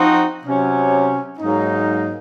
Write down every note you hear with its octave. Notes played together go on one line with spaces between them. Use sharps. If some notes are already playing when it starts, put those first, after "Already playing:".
Already playing: F3 C4 D#4 F#4
C3 F#3 C#4 F#4
G#2 F#3 A#3 D#4